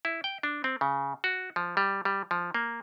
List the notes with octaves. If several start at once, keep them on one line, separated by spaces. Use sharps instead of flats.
E4
G5
D4
C4
C#3
F#4
F3
G3
G3
F3
A#3